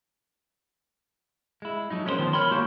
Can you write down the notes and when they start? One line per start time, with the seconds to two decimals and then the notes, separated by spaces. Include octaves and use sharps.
1.62 G#3 E4
1.90 F3 F#3 D#4
2.05 G#3 C#4 D#4 E4 A#4 C5
2.19 D#3 F3 B3
2.33 A#4 C#5 B5 C6
2.51 G3 G#3 A#3 E4 F#4 G4